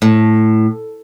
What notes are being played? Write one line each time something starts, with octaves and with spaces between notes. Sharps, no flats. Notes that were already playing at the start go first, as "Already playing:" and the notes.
A2